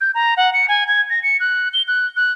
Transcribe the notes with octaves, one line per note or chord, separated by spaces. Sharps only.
G6
A#5
F#5
C#7
G#5
G#6
A#6
C#7
F#6
G7
F#6
F#6